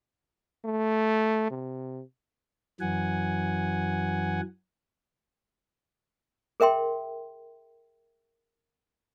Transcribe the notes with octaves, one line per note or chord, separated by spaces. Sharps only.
A3
C3
F#2 E3 F#3 F#5 G#5
G#4 A#4 E5 G5 C6